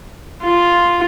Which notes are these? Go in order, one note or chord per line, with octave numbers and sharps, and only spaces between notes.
F4